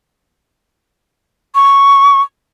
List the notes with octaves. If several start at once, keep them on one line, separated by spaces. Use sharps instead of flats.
C#6